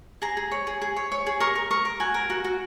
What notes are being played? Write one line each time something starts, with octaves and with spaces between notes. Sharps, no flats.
G#4 A#5
G#4
C#5
G#4
G#4
C#5
C#5
G#4
A#4 C#6
A#4
A#4 C#6
A#4
F#4 G#5
A#4
F#4
F#4